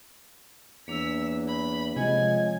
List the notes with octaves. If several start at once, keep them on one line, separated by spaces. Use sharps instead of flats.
E2 A#3 D4 C#5 E6 B6
B5
C3 F3 G#3 C#5 D#5 G#5